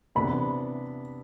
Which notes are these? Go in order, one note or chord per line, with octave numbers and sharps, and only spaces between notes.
C3 E3 B3 D4 B5